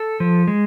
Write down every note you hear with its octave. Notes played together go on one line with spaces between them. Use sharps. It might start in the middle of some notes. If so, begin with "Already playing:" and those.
Already playing: A4
F3
G#3